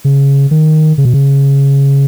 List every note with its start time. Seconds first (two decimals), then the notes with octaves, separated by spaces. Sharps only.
0.05 C#3
0.51 D#3
0.98 C#3
1.05 B2
1.14 C#3